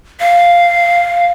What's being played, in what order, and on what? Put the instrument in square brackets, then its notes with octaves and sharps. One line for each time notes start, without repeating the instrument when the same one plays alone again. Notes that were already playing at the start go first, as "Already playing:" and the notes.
[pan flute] F5